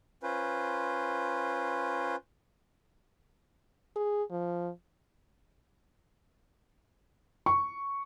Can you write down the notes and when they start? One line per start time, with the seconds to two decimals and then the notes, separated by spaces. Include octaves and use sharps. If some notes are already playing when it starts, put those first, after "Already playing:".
0.23 C#4 F4 B4 C5
3.96 G#4
4.31 F3
7.46 C#6